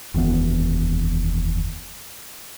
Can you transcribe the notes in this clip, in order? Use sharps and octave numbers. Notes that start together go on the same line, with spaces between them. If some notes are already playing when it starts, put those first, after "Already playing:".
F1 D#2 E3 B3